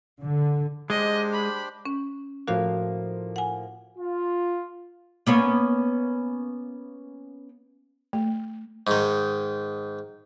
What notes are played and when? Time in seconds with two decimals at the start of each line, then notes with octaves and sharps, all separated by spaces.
0.22 D3
0.90 G#3 D4 G4 C5 D#5
1.33 B5
1.85 C#4
2.48 A2 F3 A#3 F#4 F5
3.36 F#5 G#5
3.98 F4
5.27 A#3 B3 C#4
8.13 A3
8.87 G#2 D#3